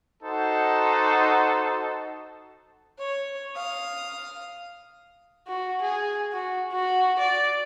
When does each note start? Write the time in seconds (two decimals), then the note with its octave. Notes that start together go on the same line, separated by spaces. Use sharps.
0.23 D#4 F#4 A4 C5 F#5
2.98 C#5
3.56 F5 D#6
5.48 F#4
5.82 G#4
6.32 F#4
6.72 F#4
7.19 D5